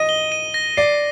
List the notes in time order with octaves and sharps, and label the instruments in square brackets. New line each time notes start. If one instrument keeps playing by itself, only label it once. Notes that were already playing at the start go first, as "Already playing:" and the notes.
Already playing: [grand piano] D#5 [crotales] D#7
[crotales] G7
D#7
A#6
[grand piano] D5 [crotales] C7